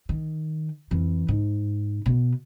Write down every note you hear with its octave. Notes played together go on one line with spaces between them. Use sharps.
D#3
F2 E3
G#2
B2 B3